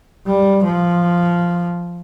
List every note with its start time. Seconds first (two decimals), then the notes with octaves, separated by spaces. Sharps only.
0.26 G3
0.64 F3